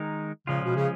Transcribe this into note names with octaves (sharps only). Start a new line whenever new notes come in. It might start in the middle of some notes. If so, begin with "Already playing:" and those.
Already playing: D#3 G#3 D#4 A#4
A#2 C#3 F3 G#3 C#4 F4
B2
C#3